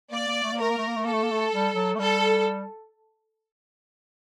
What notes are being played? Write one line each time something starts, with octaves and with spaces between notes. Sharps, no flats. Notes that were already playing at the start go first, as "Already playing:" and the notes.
A#3 D5
A#3
A3
A#3
A3 A#4
A#3
A3
A#3
A3
A#3 A4
A3
A#3
A3
G3
F#3
A3
G3 A4